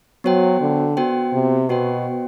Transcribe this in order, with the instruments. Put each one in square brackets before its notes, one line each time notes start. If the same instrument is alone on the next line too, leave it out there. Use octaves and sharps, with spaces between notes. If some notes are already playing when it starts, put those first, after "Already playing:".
[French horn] F#3 [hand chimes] B3 F#4 C5 G5
[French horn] D3
[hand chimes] B3 F#4 C5 G5
[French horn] C3
[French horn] B2 [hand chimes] B3 F#4 C5 G5